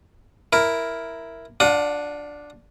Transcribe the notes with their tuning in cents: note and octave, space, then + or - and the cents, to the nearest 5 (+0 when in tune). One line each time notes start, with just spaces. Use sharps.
E4 +0 A#4 +0
D4 +0 F4 +30 F#5 -10